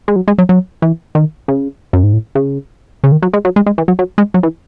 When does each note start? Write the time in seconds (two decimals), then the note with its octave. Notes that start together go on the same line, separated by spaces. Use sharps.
0.08 G#3
0.16 F#3
0.28 G#3
0.38 F#3
0.49 F#3
0.82 E3
1.15 D#3
1.48 C#3
1.93 F#2
2.03 G#2
2.13 A2
2.35 C#3
3.04 C#3
3.12 D#3
3.22 F#3
3.33 G#3
3.45 F#3
3.56 G#3
3.66 G#3
3.78 E3
3.88 F#3
3.99 F#3
4.18 G#3
4.34 F#3
4.43 E3